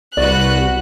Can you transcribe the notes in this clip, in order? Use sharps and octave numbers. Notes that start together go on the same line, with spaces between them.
C2 F#4 B4 D5 F#6